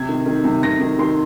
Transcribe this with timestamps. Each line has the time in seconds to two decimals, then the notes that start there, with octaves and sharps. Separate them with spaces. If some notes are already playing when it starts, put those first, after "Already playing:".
Already playing: C3 G#6
0.09 D#3
0.26 D#3
0.44 C3
0.63 C3 A#6
0.81 D#3
0.99 D#3 C6